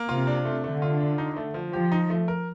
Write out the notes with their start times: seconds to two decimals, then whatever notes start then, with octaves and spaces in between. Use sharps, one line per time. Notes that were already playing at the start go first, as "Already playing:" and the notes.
Already playing: A#3
0.09 C3 F4
0.27 D4
0.45 A3
0.64 D3 A3
0.82 F4
1.01 D4
1.18 D#4
1.36 A3
1.54 F3
1.73 F3 G4
1.92 D#4
2.10 A3
2.28 A#4